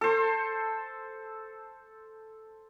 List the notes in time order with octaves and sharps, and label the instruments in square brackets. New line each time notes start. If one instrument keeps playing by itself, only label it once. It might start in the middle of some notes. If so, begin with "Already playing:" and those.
[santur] A4 C5